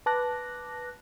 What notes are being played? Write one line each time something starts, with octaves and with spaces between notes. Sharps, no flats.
B4 A5 D6 F#6 A#6